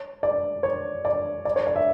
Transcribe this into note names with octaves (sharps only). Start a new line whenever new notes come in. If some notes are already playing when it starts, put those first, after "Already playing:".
Already playing: C#5
D5
C#5
D5
D5
C#5
D5
E5